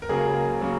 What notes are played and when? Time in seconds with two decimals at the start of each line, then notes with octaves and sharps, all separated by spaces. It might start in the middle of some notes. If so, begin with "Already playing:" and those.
0.02 A#4
0.09 C#2 C#3 F#3 A#3 G#4
0.61 C#3 F#3 A#3